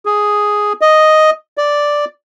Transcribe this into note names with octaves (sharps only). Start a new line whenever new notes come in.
G#4
D#5
D5